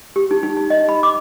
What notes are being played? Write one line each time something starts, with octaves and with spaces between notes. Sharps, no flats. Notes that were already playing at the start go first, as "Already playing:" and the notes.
G4
D#4
D#4
D#4
D#5
B5
D6